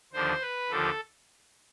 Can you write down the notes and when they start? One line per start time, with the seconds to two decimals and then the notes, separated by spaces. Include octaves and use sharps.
0.13 D#2 D3 F3 C5
0.42 B4
0.70 D#2 D3 F3 A4